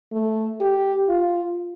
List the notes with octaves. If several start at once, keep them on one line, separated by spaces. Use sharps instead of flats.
A3
G4
F4